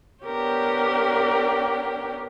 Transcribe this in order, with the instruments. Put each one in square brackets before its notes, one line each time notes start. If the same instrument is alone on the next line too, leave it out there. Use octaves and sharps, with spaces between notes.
[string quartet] B3 D4 G4 A#4 C#5 G5